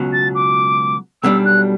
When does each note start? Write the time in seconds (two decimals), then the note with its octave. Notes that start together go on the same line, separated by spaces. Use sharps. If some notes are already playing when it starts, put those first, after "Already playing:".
Already playing: C#2 B2 F#3
0.13 A6
0.35 D6
1.23 B1 B2 G3 D4 E6
1.45 F#6